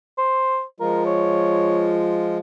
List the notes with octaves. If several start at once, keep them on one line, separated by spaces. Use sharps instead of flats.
C5
F3 G#3 F4 A#4
C#5